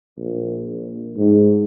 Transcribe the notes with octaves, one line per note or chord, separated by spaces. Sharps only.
A#1
A#1
G#2